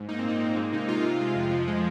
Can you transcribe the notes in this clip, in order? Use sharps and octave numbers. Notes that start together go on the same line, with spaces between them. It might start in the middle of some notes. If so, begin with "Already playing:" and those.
Already playing: G#2
A#3 D#4
C4
A#2 D#4
A#3
G#3
C3 D#4
G#3 F4
C3
G#3
F2
F3
G#3